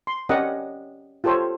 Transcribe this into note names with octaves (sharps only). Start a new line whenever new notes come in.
C6
C#4 G4 A#4 D5 D#5 F#5
F4 G4 A4 C5 C#5